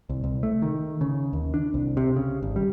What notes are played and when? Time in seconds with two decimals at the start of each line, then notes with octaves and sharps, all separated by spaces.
0.09 C2
0.24 C2
0.43 A3
0.62 D#3
1.01 C#3
1.33 D#2
1.54 D4
1.74 C2
1.97 C3
2.16 C#3
2.43 G#1
2.56 G3